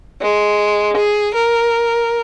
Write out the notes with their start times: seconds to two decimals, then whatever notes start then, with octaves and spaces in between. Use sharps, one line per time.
0.20 G#3
0.96 G#4
1.34 A#4